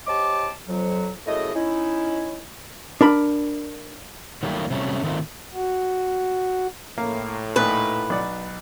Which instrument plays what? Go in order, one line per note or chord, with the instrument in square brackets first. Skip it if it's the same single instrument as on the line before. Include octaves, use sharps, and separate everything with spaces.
[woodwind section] G4 C5 C#5 D#5 A5 D6
F2 F#3
F#2 C#3 A3 E4 G#4 D#5
C#4 D#4 E4
[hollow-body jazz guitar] D4 A#4 B5
[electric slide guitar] D#3 F#3 G3 A3 A#3 G4
C3 F#3 G3 A3 C4 C#4
A2 D#3 A3 C4 F4
[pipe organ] F#4
[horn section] A2 [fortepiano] A#3
[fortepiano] A#2 A3 D#4 [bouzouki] B4
[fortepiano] B1 D5 F#5